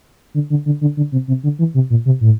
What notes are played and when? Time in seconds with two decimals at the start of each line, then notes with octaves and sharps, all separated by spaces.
0.34 D3
0.50 D3
0.66 D3
0.81 D3
0.97 D3
1.12 C3
1.28 C3
1.43 D3
1.59 E3
1.74 C3
1.90 A#2
2.05 C3
2.21 A2